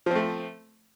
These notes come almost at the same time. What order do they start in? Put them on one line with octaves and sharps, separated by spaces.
F3 C4 A3